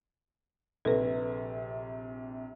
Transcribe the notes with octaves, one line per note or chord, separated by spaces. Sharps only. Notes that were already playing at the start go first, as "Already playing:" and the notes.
A#1 C3 A4 B4